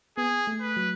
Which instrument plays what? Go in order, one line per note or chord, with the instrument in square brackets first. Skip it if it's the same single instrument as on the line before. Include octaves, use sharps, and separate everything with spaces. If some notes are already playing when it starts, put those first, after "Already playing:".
[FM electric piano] B3 [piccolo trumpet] G#4
[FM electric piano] A3
[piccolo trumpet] B4
[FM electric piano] F#3